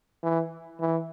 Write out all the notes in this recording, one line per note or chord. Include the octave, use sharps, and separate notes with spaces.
E3
E3